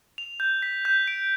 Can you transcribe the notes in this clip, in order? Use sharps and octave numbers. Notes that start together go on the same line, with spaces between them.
F7
G6
B6
G6
D7